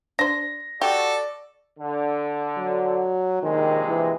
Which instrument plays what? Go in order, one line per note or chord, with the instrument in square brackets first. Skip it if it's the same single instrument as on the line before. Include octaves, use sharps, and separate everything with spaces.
[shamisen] D4 C5 [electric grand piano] A#6
[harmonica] F#4 A4 [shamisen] G4 [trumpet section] D5
[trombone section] D3
[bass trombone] F#3
[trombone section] A#1 C3 G#3 [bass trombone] D#3
[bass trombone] E3